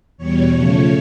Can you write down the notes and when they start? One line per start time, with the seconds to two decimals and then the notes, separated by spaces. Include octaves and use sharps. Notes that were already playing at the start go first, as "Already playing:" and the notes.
0.17 E2 B2 G3 C#5
0.54 C#3 F3 A3